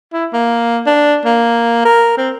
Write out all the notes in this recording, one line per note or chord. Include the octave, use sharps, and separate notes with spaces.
E4
A#3
D4
A#3
A#4
C4